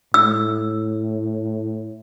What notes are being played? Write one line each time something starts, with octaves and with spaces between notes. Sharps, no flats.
A2 E6